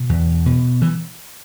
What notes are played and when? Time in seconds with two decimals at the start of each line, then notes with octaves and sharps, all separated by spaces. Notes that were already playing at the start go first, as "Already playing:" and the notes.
Already playing: B2
0.09 E2
0.46 B2
0.82 E3